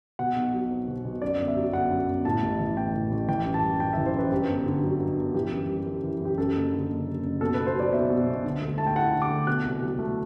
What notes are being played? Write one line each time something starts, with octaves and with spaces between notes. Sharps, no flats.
B2 F#5
B1
F#3
C4
B2
B1
F#2 D5
G1
E5
F#3
G1 F#5
F#2
G1
A2 A5
A1
E3
A1 G5
A2
A1
E3 G5
F#2
A5
G3
F#2 G5
E5
E3
C5
F#2 B4
G2 G4
G1
D3
F#3
G2
G1
E3 G4
F#2
G3
F#2
E3
F#2 G4
F#2 A4
F#1
D3
F#1
F#2
F#1
B2 A4
B1 B4
C5
F#3 D5
B1 E5
B2
B1
D3
D2
A3 A5
G5
E4 F#5
D3
D6
D2
B2 F#6
C2
F#3
A3